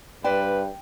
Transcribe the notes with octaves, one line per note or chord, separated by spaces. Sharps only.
G2 B4 C5 D5 G5